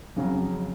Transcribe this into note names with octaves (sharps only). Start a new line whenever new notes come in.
F2 C#3 F#3